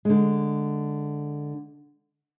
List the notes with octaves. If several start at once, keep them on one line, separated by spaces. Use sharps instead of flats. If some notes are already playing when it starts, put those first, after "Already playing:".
D3 G#3